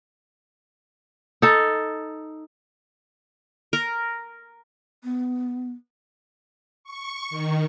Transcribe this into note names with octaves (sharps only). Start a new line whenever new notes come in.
D#4 A4
A#4
B3
C#6
D#3